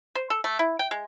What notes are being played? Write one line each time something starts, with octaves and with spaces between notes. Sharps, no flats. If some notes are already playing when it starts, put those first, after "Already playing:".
C5
A4
A3
E4
G5
G#3